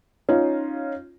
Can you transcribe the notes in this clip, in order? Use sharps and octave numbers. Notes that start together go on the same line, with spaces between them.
C#4 D#4 F4